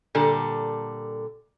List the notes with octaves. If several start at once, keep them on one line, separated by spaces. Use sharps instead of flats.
A#2 D3 G3 A4